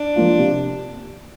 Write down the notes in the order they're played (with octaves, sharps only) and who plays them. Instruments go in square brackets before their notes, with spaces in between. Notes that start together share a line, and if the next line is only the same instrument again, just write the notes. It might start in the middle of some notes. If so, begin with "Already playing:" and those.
Already playing: [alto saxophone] D4
[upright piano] F3 A#3 F4
C3